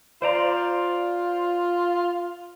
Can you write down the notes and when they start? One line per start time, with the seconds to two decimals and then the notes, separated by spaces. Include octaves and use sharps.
0.22 F4 C5 D5 A#5